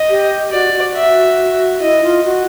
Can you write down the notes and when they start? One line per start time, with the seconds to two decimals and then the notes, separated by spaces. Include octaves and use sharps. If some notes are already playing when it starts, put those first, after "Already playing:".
Already playing: D#5
0.10 G4
0.52 F#4 D5
0.74 F#4
0.96 E5
1.81 E4 D#5
2.03 F4
2.25 F#4